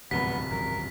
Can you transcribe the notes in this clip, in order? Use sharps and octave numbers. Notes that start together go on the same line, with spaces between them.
D1 C2 G#2 F3 F#3 B3 B5 B6
G#1 F#2 F3 A#4